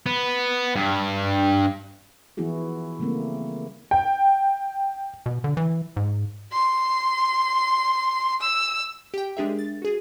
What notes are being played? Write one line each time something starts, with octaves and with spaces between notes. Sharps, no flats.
B3
G2
E3 F3 B3 E4 F#4 G#4
C#3 G3 A3 A#3 C4 C#4
G5
B2
D3
E3
G#2
C6
E6
G4 G5
G#3 D4 G4 G#4 A#4 E5
A6
F#4 G#4